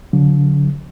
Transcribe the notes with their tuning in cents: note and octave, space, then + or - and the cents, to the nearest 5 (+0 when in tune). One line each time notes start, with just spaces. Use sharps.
D3 -45 F#3 -40